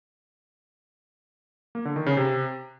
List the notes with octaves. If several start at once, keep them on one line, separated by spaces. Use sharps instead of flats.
A#3
D3
D#3
C#3
C3